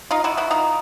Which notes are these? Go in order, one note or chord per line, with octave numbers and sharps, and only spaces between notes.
D#4 F4
E4 F#4
E4 F#4
D#4 F4